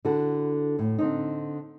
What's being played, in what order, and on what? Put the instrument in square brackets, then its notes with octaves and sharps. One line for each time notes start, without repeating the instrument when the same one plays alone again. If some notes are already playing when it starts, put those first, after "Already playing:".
[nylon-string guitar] D3 E4 F#4 A4
A2
D3 C4 D#4